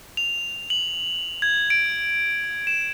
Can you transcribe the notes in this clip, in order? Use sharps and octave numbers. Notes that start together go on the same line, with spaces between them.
F7
F#7
G#6
D7
E7